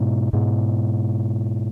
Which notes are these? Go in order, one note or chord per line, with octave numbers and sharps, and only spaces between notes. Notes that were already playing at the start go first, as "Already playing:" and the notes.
Already playing: G#2 B2
G#2 B2